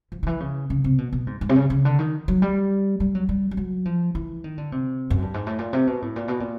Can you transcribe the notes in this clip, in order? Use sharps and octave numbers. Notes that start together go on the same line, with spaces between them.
F3
D#3
E3
C#3
C#3
C3
B2
B2
G#2
G#2
C3
C#3
C#3
D3
D#3
F#3
G3
G3
F#3
G3
G3
F#3
F3
E3
D#3
D3
C3
F#2
G2
G#2
A2
A#2
C3
B2
A2
A#2
B2
A#2